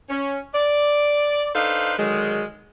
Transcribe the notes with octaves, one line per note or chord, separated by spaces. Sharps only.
C#4
D5
D4 D#4 A4 B4 C5 F5
D3 D#3 F#3 G#3